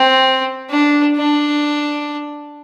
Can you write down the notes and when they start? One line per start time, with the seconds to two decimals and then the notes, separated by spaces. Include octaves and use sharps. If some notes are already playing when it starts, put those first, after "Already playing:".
Already playing: C4
0.70 D4
1.17 D4